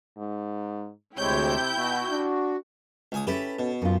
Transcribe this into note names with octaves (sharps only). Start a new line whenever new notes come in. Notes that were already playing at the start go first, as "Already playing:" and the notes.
G#2
D2 C3 G#3 E4 C#5 G5 G6
B2 F#4
D4
C#2 G#5 D#6
C#4 E4 G4 A4 B4
B2
F#2 F4